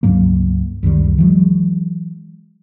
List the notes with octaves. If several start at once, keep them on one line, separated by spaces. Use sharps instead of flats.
C#2 G2 F#3 A#3
C#2 F#2 D#3 G3
E3 F#3 G#3